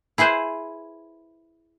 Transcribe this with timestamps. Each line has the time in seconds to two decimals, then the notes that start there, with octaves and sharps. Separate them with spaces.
0.18 E4 G#4 B4 C5